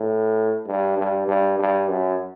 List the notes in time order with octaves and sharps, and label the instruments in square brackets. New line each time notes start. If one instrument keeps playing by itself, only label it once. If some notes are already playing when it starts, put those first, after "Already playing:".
Already playing: [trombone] A2
G2
G2
G2
G2
F#2